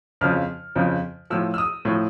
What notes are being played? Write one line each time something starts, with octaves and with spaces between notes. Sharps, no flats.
F2 C#3 F3 F6
F2 C#3 F3
A2 F3 E6
E6
D#6
A2 F3